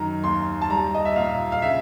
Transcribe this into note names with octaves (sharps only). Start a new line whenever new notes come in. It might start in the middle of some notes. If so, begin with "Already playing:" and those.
Already playing: F#2 D#3 A#5
D#2 C6
A5
G3 A#5
D#5
E5
A#2 F5
F5
C#3 E5